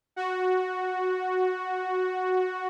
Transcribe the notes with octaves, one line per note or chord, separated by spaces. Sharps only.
F#4